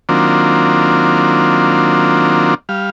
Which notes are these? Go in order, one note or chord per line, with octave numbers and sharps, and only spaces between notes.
D#3 F#3 A#3 C4 D4 F4
G3 F5